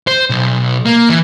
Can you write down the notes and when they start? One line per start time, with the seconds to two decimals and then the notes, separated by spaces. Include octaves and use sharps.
0.07 C5
0.30 B1
0.86 A#3
1.09 E3